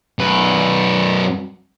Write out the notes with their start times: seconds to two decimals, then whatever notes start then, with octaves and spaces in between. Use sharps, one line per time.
0.19 F#2 B4